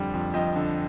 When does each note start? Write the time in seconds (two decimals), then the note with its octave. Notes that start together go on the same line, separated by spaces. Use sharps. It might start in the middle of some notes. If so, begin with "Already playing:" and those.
Already playing: F2 D3 G3
0.13 F2
0.33 F2 D#5 G5
0.56 D3